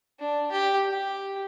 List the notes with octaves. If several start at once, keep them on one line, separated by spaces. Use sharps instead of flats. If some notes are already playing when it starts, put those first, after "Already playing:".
D4
G4
G4